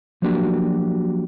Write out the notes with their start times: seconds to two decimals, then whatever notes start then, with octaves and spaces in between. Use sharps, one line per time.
0.22 F3 F#3 A#3 D4 F#4 G4